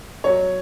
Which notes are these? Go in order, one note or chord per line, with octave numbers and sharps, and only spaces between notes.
F#3 C#5